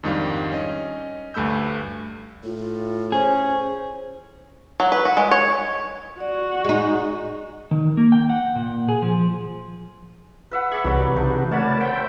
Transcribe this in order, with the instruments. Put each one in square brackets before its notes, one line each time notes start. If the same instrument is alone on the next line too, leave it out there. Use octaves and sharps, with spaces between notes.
[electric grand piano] F2 G#2 D#3 G3 D4 F5
C#4 D#5
D2 G2 A3 B5 E6 G6
[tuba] A2 [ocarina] F4
[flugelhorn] C#4 [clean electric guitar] G#4 [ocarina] C5
[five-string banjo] F#3
B4
F#4
G#3
C#5
[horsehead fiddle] F#4 [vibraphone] D5
[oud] G#3 D#4
[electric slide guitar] D#3
A#3
G5
F#5
A#2
G#4
F3
[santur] B4 E5 F#5
[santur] G#4 D5 [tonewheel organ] B5 C#6
[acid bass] C2 [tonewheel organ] C3 E3 F#4 [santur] F#3 G3 D5
[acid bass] C#3 [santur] D4 D#4
[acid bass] A3 [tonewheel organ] A#4 D5 A5 [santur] C#5 F#5 B5
[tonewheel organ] C5 E5 G5 [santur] F#5 A5